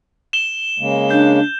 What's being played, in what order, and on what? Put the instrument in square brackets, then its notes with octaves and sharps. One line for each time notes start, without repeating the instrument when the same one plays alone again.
[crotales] E7 G7
[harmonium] C#3 G#3 A#3
[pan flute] D4 [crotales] G6